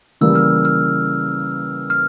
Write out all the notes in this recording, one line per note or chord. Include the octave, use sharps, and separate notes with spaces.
C#3 E3 G3 A#3 E6
F6
F6
F6